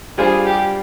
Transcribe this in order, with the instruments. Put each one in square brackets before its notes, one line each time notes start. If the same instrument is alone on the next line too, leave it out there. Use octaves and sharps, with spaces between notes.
[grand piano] G3 D4 F4 C5 [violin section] G#4
[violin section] G4